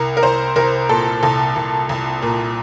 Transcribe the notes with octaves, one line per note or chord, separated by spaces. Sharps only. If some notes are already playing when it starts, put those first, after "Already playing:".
Already playing: C2 A#4
A#4
C2 C5
C2 A#4
A#2 A4
C2 A4
C2
C2
A#2